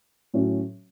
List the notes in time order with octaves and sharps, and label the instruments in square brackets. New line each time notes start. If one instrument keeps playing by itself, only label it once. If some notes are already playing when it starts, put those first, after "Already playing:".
[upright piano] A2 F#3 C#4